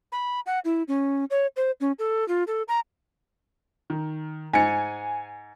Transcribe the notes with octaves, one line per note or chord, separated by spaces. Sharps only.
B5
F#5
E4
C#4
C#5
C5
C#4
A4
F4
A4
A#5
D#3
G#2 G#5 C#7